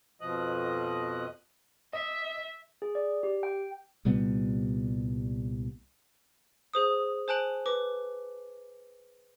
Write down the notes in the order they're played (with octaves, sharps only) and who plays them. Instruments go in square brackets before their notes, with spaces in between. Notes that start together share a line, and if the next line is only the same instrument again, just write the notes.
[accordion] F2 B2 F3 D#5 D#6 F#6
[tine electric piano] D#5 [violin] E5
[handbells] G#4
D5
G4
G5
[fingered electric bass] C2 A#2 G3 B3
[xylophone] G#4 C5 D#6
C5 G#5 A5 F#6 D7 F#7
B4 D6